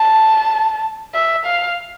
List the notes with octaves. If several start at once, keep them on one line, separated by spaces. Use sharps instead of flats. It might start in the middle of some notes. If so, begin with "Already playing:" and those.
Already playing: A5
E5
F5